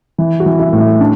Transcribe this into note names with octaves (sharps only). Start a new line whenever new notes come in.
E3
F#4
E3
E4
A2
E4
D4